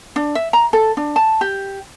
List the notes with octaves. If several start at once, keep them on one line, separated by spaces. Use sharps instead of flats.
D4
E5
A#5
A4
D4
A5
G4